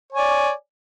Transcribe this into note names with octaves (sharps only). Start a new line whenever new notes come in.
C#5 D5 G#5